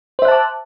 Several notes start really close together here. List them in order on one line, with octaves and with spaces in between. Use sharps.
C5 E5 F#6 A5 D6